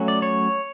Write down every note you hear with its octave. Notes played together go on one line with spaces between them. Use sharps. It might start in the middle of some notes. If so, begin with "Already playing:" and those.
Already playing: F#3 A3 C#4
D5
C#5